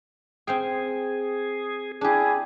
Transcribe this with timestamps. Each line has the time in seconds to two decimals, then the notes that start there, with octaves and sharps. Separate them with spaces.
0.47 C4 G#4 F5 G5
2.01 D4 E4 G4 G#4